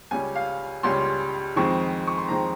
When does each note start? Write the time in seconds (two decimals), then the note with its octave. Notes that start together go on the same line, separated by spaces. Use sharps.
0.11 C#2 C#3 G3 C#4 G#5
0.36 F5
0.83 C#2 C#3 G3 C#4 C6
1.56 F2 D#3 G#3 C4 C#6
2.07 C#6
2.18 C6
2.28 F2 D#3 G#3 C4 A#5